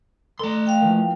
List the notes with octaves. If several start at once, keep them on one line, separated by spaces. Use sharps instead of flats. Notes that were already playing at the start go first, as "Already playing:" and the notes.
A3 A4 D5 A#5 C6
F5 G5
E3 F3 A#3